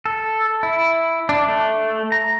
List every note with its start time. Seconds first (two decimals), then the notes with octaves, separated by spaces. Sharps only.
0.06 A4
0.63 E4
1.29 D4
1.48 A3
2.12 A#5